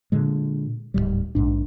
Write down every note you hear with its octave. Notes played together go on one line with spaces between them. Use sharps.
A#2 D3 G#3
D1 E2 G#2 G3
A#1 G#2 D4